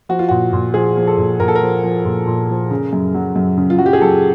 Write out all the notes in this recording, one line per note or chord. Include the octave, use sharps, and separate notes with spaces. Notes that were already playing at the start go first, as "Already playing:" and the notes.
F3 F#4
F4
A#2 F#4
A#2
F3 G#4
F3
A4
A#2
A#2 A#4
A4
A#4
F3
F3
A#2
A#2
F3
C#3
F#2
F#3
F#2
C#3
F4
F#2 F#4
G4
G#4
F#3 A4